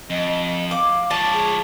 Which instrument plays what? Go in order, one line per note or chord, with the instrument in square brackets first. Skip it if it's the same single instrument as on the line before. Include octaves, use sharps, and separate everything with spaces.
[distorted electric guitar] F2 [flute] D#5
[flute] F5 [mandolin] D6
[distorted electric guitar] F3 C#5 [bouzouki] A5 [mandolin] D6
[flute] G#4